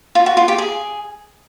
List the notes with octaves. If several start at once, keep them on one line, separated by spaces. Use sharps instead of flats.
F4
F#4
F4
G4
G#4